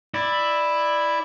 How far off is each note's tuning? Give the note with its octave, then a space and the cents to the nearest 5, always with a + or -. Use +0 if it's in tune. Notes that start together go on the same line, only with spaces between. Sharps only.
E4 +0 D5 +10